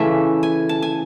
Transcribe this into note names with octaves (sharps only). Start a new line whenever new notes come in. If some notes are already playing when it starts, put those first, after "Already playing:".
Already playing: C#3 E3 A3 E5
G#5
A5
G#5